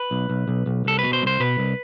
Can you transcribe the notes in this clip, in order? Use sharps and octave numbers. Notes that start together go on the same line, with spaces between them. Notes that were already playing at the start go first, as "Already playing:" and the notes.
Already playing: B4
B1
B1
B1
B1
C2 A4
B2 B4
C5
C2
C5
B2 B4
C2